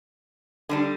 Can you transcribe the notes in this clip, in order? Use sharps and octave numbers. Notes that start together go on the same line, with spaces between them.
D3 G3 D4